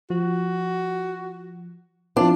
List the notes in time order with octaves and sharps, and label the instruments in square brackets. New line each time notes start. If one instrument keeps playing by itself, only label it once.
[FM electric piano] F3 [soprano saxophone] F#4
[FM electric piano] F3 C4 E4 [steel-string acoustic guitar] D4 [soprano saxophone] F4